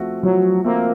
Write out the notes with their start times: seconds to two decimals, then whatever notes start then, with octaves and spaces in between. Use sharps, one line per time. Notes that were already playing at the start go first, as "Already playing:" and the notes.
Already playing: F3 A3 C4 F#4
0.23 F3 F#3
0.64 A3 A#3 C4 F#4